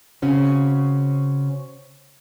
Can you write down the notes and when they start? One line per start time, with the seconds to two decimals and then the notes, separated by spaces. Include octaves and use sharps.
0.22 C#3 C4 C#4 F#4